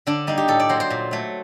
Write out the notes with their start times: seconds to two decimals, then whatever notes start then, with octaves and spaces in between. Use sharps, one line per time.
0.07 D3 D4
0.27 G3 A#3 D#4
0.37 G4
0.48 A2 A4
0.60 D5
0.69 F#3 A#3 C5
0.80 C5
0.90 A#2
1.11 F#3 A3